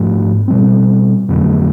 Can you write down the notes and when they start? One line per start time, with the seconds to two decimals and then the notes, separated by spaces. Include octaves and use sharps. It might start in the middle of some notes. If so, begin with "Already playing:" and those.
Already playing: G#2 F3 A3
0.48 B2 G3 C4
1.29 F2 D3 F#3 A3